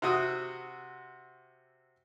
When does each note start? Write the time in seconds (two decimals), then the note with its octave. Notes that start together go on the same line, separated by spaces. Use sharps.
0.02 C3 F#4 D#6 E6